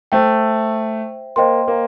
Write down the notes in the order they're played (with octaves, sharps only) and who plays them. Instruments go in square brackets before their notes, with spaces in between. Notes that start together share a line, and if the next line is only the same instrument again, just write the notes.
[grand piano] A3 [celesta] C5 E5 G5
[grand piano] A#3 [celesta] C5 D#5 G5 C6
[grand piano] A#3